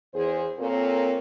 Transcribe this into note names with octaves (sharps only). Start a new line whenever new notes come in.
E2 G#4 C5
A#2 A#3 C4 F4 A4 C#5